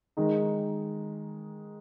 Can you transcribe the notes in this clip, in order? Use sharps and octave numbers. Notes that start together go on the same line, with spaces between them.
D#3 G#3 D#4